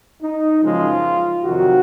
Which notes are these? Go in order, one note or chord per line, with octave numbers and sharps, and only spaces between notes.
D#4
F#2 C#3 F3 G#3 F4
F2 C3 D#3 F#3 F#4